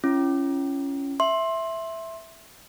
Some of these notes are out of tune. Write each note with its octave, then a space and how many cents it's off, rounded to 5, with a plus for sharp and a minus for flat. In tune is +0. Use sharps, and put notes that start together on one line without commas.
C#4 +0 F4 -45
E5 +0 C6 +20